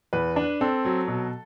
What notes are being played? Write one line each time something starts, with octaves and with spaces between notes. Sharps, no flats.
E2 B4
D4
C4 A4
F#3
B2